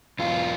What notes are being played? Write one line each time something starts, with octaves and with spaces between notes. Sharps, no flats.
E2 B2 F4